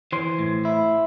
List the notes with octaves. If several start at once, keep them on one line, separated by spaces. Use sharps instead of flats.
E3 C5
A2
E4